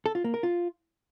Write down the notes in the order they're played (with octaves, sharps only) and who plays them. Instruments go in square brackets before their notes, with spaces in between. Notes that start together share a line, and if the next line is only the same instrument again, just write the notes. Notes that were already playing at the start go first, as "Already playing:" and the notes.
[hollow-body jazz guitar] A4
F4
A#3
A#4
F4